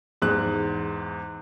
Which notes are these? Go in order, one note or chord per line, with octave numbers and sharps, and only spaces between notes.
E2 G#2 F#6